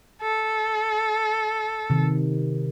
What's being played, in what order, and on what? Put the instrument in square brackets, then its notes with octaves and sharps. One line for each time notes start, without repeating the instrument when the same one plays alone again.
[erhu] A4
[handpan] C3 D#3